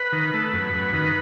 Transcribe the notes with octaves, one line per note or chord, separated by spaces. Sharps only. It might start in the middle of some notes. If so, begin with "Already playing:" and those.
Already playing: B4
D#3
A3
F#2
F#2
D#3